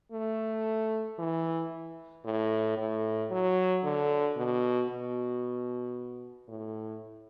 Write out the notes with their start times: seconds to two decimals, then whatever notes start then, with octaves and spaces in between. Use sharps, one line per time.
0.12 A3
1.18 E3
2.25 A2
2.77 A2
3.31 F#3
3.83 D3
4.36 B2
4.89 B2
6.48 A2